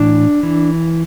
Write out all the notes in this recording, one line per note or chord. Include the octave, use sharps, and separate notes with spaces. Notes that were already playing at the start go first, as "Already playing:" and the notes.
Already playing: A2 E3 D4
E3